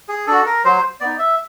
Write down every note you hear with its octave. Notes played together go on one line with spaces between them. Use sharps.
G#4
D4 F#4 A4
A#4
F#3 C5
B3 D#4 D5
E5